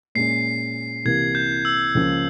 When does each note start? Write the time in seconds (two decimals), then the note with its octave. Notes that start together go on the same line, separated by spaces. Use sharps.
0.15 A#2 G#3 C#4 C7
1.05 C2 C3 E3 A#3 G#6
1.35 G6
1.65 E6
1.95 C#2 C#3 F3 A#3 C#4